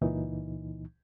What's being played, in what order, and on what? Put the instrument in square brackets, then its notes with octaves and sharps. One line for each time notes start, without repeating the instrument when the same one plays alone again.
[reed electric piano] C#2 A#2 E3 D#4